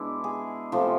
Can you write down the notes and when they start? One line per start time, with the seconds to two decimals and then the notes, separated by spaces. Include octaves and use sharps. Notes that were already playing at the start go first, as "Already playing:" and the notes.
Already playing: B2 G#3 D4 E4
0.24 G#4
0.72 C3 F3 A3 A4